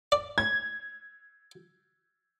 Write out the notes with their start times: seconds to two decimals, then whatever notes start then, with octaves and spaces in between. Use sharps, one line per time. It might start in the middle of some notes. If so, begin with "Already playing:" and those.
0.12 D5
0.38 G#6